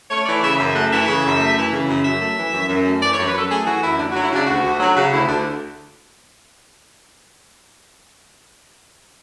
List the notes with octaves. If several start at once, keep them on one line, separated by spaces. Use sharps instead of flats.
A3 C#5
E3 D5
C#3 E5
F#2 E5
A3 F#5
E3 E5
C#3
F#2
A3
E3
C#3
F#2
F#2 E5
A3
E3
F#2
F#2
A3
E3 D5
C#5
F#2
B4
F#2 A4
A3 G#4
E3 F#4
F#2 E4
D2 D4
F#4
F#3
E4
C#3 D4
D2 F#4
D2
F#3
C#3 F#4
D2 E4
D2 D4